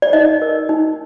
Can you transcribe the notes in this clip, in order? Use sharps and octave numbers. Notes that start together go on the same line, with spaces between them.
D5
D#4 D#5
A#4
D#4